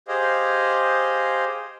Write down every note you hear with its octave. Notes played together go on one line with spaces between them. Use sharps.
G4 G#4 C5 D#5 F5